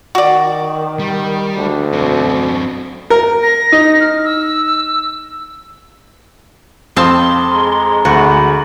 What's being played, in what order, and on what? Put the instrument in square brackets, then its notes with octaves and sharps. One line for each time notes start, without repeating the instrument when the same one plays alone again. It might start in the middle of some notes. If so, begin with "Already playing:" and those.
[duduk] D#3 [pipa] F#4 D5
[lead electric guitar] G3
[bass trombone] D2 [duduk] D4
[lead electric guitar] F#2 C4 [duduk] B2
[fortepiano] A#4
[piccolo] A#6
[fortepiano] D#4
[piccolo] F6
E6
[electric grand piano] F2 D#6 [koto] C4 F5 A5 [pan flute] C6
[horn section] G#3 A#5
[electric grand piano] D2 [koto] F#4 [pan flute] B5